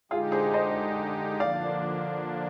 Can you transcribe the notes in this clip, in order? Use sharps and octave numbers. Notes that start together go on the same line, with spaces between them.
D3 G#3 D#4 F4 G4 G#4
G#4 C5
C5 D#5
D3 F3 A#3 D4 D5 F5